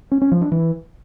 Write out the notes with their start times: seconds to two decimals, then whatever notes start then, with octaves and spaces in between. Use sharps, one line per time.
0.12 C#4
0.22 C#4
0.32 F3
0.42 D4
0.52 E3